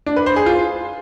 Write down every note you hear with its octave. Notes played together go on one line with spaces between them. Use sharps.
D4
B4
C5
G#4
F4